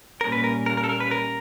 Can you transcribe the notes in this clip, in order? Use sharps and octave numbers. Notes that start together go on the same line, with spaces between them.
A#2 G3 A#3 C#4 A#4
B4
A#4
A#4
A#4
A4
A#4
B4
A#4